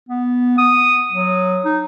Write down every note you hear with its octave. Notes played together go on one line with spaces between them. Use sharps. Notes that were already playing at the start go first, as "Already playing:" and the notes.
B3
D#6
F#3
D#4